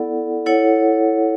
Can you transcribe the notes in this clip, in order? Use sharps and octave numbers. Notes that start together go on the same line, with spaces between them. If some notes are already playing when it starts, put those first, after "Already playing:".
Already playing: B3 E4 A4 D5 F#5
E4 A4 C#5 F#5